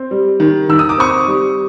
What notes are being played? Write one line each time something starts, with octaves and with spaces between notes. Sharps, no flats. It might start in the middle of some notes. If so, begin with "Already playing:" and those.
Already playing: C4
G3
D#3
D#3 E6
D#6
D6
C4 C#6 D#6
G3